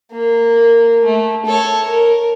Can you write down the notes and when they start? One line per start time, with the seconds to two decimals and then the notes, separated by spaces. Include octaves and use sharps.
0.12 A#3
1.05 A3
1.46 A4 C#5
1.87 A#4